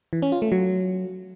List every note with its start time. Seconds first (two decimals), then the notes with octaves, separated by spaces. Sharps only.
0.13 E3
0.22 C#4
0.32 F4
0.42 A3
0.52 F#3